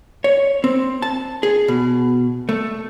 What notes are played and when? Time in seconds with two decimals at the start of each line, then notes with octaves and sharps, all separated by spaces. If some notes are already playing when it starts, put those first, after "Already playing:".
0.24 C#5
0.64 C4
1.02 A5
1.43 G#4
1.68 B2
2.49 A3